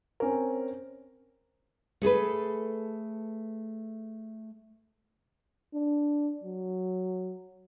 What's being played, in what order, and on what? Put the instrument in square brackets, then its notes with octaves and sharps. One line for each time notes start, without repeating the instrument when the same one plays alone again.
[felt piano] C4 C#4 A#4
[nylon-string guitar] A3 G#4 A4 B4
[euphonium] D4
F#3